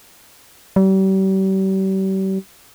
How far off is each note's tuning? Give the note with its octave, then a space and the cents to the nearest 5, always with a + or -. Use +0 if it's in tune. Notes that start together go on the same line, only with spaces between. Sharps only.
G3 -40